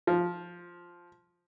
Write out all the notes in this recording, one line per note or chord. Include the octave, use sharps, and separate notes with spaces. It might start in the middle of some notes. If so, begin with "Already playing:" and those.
F3